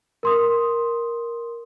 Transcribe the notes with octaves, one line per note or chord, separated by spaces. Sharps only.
A#4 C6 D#6